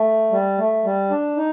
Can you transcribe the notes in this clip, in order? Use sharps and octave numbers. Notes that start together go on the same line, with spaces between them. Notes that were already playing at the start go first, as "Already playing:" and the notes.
Already playing: A3
G3
A3
G3
D4
D#4